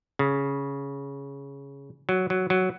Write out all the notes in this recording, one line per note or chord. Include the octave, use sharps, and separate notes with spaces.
C#3
F#3
F#3
F#3